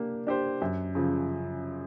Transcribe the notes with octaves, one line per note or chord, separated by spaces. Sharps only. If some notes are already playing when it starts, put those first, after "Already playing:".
Already playing: A#3 D4 G4
D4 G4 C5
F#2
C#3 F3